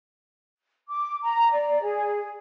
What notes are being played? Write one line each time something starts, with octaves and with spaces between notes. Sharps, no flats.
D6
A#5
D5
G#4